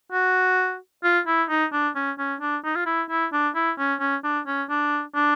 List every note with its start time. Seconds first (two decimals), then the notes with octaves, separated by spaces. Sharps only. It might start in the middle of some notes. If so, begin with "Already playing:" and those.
0.12 F#4
1.04 F4
1.27 E4
1.49 D#4
1.73 D4
1.96 C#4
2.19 C#4
2.41 D4
2.64 D#4
2.76 F4
2.86 E4
3.10 E4
3.33 D4
3.55 E4
3.79 C#4
4.00 C#4
4.24 D4
4.47 C#4
4.70 D4
5.15 D4